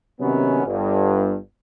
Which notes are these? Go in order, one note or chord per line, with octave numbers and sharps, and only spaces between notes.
C3 D#3 F#3 B3 C#4
G1 G2